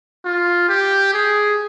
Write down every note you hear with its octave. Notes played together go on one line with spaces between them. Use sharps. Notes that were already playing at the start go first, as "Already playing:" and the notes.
F4
G4
G#4